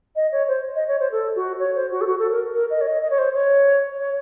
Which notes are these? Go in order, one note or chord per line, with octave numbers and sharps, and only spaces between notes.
D#5
C#5
C5
D#5
C#5
C5
A4
F#4
C#5
C5
F#4
A4
F#4
A4
A#4
A#4
D#5
C#5
D#5
D#5
C#5
C5
C#5
C#5